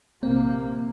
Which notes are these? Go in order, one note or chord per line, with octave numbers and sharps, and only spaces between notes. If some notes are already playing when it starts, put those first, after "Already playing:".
A#1 C3 A#3 C4